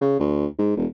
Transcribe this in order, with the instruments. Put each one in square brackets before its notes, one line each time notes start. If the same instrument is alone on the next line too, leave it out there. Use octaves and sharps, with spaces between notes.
[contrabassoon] C#3
D2
G#2
E1